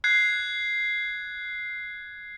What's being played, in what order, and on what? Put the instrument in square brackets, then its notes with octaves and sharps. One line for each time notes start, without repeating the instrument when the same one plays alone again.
[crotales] F#6 G#6 C7